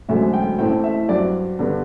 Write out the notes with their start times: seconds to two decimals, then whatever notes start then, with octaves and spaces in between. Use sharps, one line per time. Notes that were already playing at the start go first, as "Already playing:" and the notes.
0.09 E1 D2 D3 F#3 C4 E5
0.33 G5
0.59 A1 A2 E3 A3 C4 G5
0.84 E5
1.09 G2 F#3 C4 D5
1.59 G2 D3 G3 B3